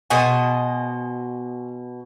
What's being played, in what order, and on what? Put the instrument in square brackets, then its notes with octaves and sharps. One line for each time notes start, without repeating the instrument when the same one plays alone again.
[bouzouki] B2 D#5 G#5 [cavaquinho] F#4 G#4 C5